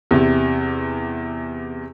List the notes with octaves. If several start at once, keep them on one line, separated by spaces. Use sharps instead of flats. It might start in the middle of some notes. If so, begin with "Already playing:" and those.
E2 C3